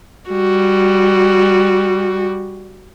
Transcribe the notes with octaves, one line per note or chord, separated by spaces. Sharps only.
G3 F#4